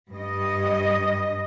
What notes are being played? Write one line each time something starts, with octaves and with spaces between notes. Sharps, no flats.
G2 D#5